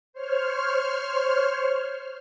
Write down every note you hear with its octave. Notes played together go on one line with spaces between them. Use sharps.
C5 C#5 F6